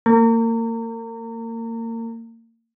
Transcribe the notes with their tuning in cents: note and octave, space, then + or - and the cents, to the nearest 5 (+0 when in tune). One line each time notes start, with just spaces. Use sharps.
A#3 -35